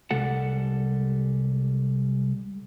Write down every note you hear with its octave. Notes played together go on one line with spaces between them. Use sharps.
C2 G3 G#3 A4 F#5